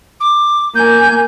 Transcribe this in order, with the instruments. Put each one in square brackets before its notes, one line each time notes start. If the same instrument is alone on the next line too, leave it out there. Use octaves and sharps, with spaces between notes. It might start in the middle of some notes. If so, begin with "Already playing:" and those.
[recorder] D6
[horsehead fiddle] A#3 G#5 [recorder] G6